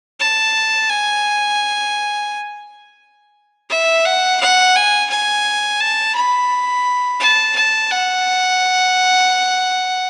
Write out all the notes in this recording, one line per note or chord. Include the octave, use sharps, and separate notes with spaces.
A5
G#5
E5
F#5
F#5
G#5
G#5
A5
B5
A5
A5
F#5